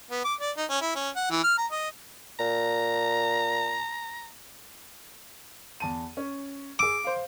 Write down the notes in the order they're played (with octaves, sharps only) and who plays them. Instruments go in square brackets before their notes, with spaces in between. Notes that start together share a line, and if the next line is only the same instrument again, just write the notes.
[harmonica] B3
D6
D5
D#4
C#4
E4
C#4
F#5
E3
F6
A#5
D#5
[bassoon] A#2 [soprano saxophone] A#5
[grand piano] E2 A5 D#7
C#4
[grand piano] G#4 E6 [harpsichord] D6
[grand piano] C5 F5